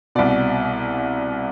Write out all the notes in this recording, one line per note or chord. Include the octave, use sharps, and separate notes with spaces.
C2 B2 D5